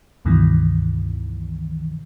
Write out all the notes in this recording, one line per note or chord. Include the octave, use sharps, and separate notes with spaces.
C#2 G2 B2 D#3 E3